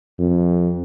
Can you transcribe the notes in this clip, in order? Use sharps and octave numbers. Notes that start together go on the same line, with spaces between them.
F2